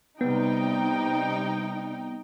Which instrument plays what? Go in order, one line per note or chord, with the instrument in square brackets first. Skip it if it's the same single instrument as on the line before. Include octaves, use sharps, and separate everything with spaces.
[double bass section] C3 G3 [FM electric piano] B3 [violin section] D#4 G5